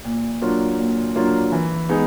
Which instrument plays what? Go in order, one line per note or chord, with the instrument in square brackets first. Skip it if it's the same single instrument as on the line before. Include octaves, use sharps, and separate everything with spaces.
[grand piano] A#2
F#3 A#3 D4 F4
A#2
F#3 A#3 D4 F4
E3
G#3 B3 D#4 G#4